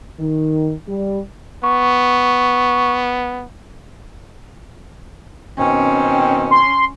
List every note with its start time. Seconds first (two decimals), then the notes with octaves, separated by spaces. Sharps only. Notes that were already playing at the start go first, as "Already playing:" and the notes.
0.18 D#3
0.87 G3
1.63 B3 C#6
5.59 B2 D#3 C4 C#4
6.51 C6